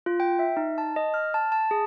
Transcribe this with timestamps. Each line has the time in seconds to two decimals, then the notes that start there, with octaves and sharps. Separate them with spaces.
0.06 F4
0.20 G5
0.39 E5
0.57 D#4
0.78 A5
0.96 D#5
1.14 F6
1.34 A5
1.52 A5
1.71 G#4